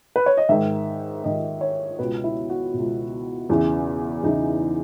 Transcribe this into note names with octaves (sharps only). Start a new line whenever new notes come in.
B4
C#5
D#5
G#2 D#3 E5
G#2 D#3 D#5
C#5
C#2 B2 B4
E4
F#4
B2
C#2
E2 C#3 E3
E2 C#3 E3 D#4